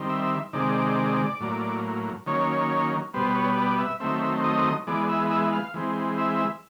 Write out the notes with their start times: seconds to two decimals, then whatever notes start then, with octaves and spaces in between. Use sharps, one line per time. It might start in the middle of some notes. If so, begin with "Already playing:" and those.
Already playing: D#3 G3 C4
0.09 E5
0.53 C3 D#3 G#3 D5
1.40 A2 F#3 A#3
2.26 D#3 F#3 A#3 C#4 C#5
3.14 B2 G3 B3 C5
3.35 C#5
3.57 D5
3.78 E5
4.00 D#3 F#3 A3 C4 E5
4.44 D#5
4.87 E3 G#3 B3 D5
5.09 E5
5.31 E5
5.53 F5
5.74 E3 G#3 C4
6.18 E5